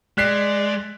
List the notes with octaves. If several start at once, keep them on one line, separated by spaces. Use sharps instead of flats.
G#3 D5 F#6 B6 C7